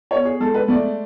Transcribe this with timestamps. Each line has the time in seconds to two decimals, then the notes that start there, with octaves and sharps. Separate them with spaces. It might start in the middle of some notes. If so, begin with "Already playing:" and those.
0.11 B3 C#5
0.25 G#4
0.40 G#3 A4
0.54 B4
0.68 A3 D5